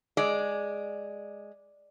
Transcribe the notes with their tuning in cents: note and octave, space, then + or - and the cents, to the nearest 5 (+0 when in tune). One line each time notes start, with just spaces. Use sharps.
G#3 +0 D5 +0